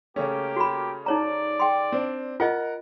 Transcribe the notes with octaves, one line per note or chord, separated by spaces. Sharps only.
C#3 A3 A#3 C#4 G4
F#4 B5
D#4 C#5 D5 A#5
G5 C6
C4 D4
F4 A#4 D#5 F#5